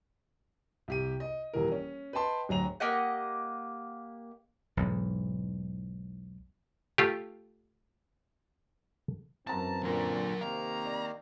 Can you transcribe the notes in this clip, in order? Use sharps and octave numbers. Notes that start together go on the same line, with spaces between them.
C2 G4 D#7
D#5
D#1 E3 A#4
C#4
B4 D#5 G5 A5 C6
D1 F#3 A#5 F7
A#3 G4 D#5 F#5
B1 E2 G#2
A3 F4 G4
F#2 E3 C4 A5 A#5 A6
A#2 D3 F#3 A#4
C3 D#3 A#3 F5 A#5
D5